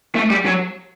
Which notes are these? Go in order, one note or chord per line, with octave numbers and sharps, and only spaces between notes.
A3
G3
F#3